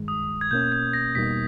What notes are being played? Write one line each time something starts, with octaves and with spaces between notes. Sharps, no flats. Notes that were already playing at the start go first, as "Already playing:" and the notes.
Already playing: G2 D#3 G#3
D#6
G#6
B2 A#3 C#4 G6
G#6
A#6
E2 B2 G3 A#3 D#4 B6